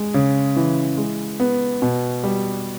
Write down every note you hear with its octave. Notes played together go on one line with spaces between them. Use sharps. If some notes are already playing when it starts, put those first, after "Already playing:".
Already playing: G#3
C#3
E3
G#3
B3
B2
G3